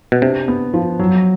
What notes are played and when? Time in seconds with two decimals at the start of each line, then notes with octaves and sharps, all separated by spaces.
0.12 B2
0.22 C3 D4
0.48 B3
0.74 F3
0.99 F#3